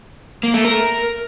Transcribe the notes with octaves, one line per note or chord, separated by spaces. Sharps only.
A#3
A3
A#4